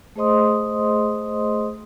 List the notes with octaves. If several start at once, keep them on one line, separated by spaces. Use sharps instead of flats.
A3 G#4 C5 D#5 C6 D#6